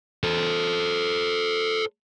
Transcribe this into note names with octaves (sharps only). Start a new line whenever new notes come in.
A4 C5